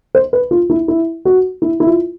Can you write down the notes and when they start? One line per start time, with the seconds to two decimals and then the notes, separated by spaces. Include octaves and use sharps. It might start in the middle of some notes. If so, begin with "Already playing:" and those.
0.15 C5
0.33 B4
0.51 F4
0.70 E4
0.88 E4
1.25 F#4
1.62 E4
1.80 E4
1.87 F4